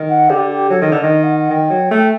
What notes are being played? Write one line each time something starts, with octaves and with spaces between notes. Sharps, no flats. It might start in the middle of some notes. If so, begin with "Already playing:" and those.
Already playing: D#3
F#5
D3 G4
G4
F#3 A4
D#3
D3
D#5
D#3
F#5
F#5
D#3 G5
F#3
A3